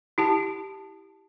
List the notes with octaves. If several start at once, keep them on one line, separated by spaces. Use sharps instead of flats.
E4 G4 A5